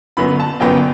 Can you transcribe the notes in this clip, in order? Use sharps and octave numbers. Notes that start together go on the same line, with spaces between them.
G1 F#2 F#3 B3 B5
A5
G1 F#2 F#3 B3 G5